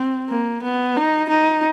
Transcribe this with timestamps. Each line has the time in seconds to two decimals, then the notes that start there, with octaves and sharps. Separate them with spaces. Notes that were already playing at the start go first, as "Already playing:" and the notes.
Already playing: C4
0.29 A#3
0.63 B3
0.97 D#4
1.30 D#4